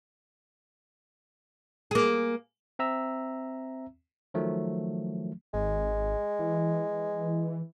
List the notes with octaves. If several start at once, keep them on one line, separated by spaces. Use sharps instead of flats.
A#3 G#4
C4 E5 A#5 E6
D#3 F3 F#3 A3
G#1 G#3
E3